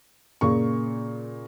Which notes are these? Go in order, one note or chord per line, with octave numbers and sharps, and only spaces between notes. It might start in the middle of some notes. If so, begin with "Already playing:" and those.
A#2 C#3 A#3 C#6